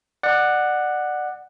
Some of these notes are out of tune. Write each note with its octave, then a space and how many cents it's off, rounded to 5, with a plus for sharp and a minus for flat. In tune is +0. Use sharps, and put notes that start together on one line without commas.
D5 +25 F#5 +0